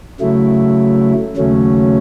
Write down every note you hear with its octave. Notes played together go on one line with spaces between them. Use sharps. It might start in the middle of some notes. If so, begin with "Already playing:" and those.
C#3 F#3 A3 E4
D#2 C#3 F#3 A3 C#4